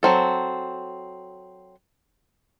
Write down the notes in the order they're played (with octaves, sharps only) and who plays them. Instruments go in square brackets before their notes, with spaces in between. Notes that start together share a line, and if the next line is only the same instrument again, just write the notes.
[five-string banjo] F#3 C4 A4